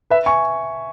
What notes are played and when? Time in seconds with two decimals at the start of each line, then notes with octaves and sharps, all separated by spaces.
0.10 B4 E5
0.26 G#5 C#6